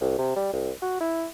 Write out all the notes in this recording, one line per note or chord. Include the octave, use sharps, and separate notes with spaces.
C2
C3
G3
C2
F#4
E4